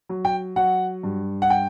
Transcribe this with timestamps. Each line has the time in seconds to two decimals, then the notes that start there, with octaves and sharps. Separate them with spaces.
0.09 F#3
0.25 G5
0.56 F#3 F#5
1.03 G2
1.42 F#5
1.50 G5